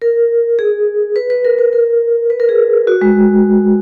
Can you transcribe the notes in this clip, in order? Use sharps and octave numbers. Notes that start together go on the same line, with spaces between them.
A#4
G#4
B4
B4
A#4
B4
A#4
B4
A#4
G#4
F#4
G#3